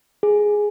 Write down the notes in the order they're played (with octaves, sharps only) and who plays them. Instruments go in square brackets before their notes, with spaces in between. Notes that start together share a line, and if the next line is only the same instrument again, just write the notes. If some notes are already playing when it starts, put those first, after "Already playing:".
[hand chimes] G#4